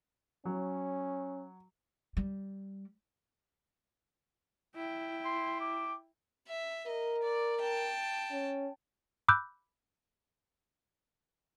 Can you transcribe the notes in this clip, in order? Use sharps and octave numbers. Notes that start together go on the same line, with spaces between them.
F#3 C#4
G3
E4 G5
C6
D6
E5
A#4 D#5
D5
G5 A5
C#4
B5 D6 E6 F#6 G6